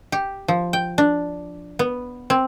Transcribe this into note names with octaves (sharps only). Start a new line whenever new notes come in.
G4
F3
G5
D4
B3
C4